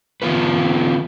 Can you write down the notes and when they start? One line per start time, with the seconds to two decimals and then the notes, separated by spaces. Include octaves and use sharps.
0.22 D3 E3 B3 F4 B4